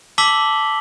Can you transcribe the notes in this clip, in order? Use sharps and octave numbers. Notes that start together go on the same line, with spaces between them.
A5 D6 E6 B6 F#7 G7